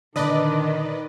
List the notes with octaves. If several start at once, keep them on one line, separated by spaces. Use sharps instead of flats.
A#2 D3 D#3 D4 B4 D5 D#5